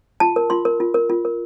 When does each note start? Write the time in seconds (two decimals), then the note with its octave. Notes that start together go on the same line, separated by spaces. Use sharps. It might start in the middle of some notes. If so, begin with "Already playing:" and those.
0.20 F4 A5
0.36 A#4
0.50 F4 C6
0.65 A#4
0.80 F4
0.94 A#4
1.10 F4
1.25 A#4